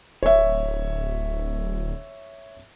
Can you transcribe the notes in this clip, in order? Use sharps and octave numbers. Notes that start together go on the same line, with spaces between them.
D1 C#5 E5